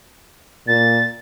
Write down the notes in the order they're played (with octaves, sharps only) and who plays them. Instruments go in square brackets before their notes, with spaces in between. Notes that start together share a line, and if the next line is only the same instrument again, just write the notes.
[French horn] A#2 [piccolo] A6